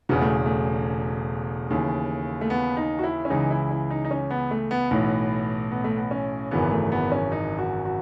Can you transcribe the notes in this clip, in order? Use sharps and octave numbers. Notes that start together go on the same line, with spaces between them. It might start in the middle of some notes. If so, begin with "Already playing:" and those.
E1 E2 C#3 B3
A3
A3
D#2 C#3 E3
A3
B3
D#4
F#4
E4
C#4
C#2 C#3 E3 D#4
E4
E4
D#4
D#4
C#4
B3
A3
B3
B1 A2 E3 B3
B3
A3
B3
C#4
G#1 F#2 C#3 E3 B3
A3
B3
C#4
D#4
F#4
F#4